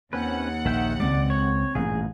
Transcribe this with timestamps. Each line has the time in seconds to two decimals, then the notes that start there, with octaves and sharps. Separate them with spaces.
0.13 D#2 C4 C#4 B4 F#5
0.65 A#1 D#3 E5 G5
1.00 C#2 G#3 C4 D5
1.30 C#5
1.75 A1 G2 A#2 G#4